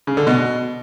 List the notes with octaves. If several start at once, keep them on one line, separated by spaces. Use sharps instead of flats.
C#3
D3
B2